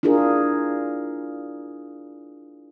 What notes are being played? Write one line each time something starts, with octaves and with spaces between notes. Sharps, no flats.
D4 E4 F4 G#4 A#4